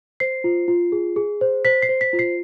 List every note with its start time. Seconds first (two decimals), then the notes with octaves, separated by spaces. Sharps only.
0.20 C5 C7
0.44 F4
0.68 F4
0.92 G#4
1.16 G#4
1.41 C5
1.65 C5 B6
1.82 C7
1.89 C5
2.01 B6
2.13 F4
2.19 C7